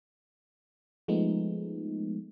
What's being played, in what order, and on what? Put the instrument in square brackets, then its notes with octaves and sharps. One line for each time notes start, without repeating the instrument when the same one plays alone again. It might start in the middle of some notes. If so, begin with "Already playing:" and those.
[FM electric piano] F3 G#3 A3 B3 D#4